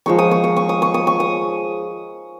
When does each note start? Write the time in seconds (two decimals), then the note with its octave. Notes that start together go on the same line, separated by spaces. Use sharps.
0.06 F3 G#3 D#4 C#6
0.19 D#6
0.31 C#6
0.44 D#6
0.56 C#6
0.69 D#6
0.82 C#6
0.94 D#6
1.07 C#6
1.20 D#6